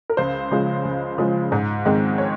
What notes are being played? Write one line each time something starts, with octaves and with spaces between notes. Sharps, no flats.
A#4
C#2 C5
C#3 F3 G#3
C#2
C#3 F3 G#3
G#2
D#3 G#3 C4
C#5